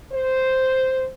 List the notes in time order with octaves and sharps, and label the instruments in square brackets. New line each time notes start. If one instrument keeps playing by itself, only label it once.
[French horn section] C5